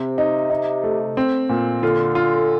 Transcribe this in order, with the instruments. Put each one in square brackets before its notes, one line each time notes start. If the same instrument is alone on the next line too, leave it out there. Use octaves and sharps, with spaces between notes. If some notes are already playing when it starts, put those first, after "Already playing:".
Already playing: [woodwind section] C3 [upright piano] C4
[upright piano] D#4
D#4
A3
C4
A#2
[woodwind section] D3 [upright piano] F4
[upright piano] F4